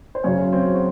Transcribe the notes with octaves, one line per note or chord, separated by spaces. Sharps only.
C5
F#2 C#3 F#3 C#4 C#5
C4 C5
F#4